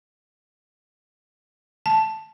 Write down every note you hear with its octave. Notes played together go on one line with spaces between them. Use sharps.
A5